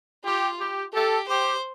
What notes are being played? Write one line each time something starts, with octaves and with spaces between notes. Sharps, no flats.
F4 G4
G4
G4 A4
G4 C5